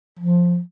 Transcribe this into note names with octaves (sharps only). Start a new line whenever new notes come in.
F3